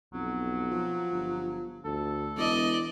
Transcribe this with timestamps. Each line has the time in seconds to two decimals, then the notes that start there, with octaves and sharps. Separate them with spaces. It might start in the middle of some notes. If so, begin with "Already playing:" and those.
0.14 B1 F2 F#3
0.71 F3
1.12 G1
1.85 D2 A4
2.37 E1 E3 D5 D#5